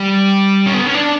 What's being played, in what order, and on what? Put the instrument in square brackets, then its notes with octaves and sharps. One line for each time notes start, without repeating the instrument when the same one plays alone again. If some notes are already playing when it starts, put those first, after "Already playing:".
Already playing: [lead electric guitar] G3
C#4
B3
C#4
D4